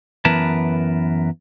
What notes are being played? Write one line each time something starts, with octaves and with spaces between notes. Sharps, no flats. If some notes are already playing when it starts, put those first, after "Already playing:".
F#2 E3 B3 A#4 B4 A5